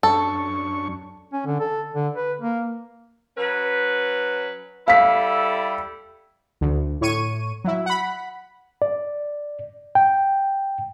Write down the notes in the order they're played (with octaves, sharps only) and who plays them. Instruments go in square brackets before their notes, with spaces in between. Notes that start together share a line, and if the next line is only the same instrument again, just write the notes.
[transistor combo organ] F#2 D4 C#6 [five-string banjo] A4
[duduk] C#4
D3
A4
D3
B4
A#3
[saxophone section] F#3 C#4 B4
[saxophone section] G3 E4 A4 [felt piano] F5 B6
[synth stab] D2
A2 C#5 C#6 D#7
F#3 E4
F#5 B5
[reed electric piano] D5
G5